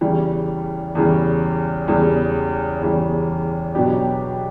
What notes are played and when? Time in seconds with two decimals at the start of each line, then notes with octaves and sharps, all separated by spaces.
0.01 E2 C#3 E3 G3
0.95 E2 C#3 E3 G3
1.88 E2 C#3 E3 G3
2.82 E2 C#3 E3 G3
3.75 B2 F#3 B3 D4 G4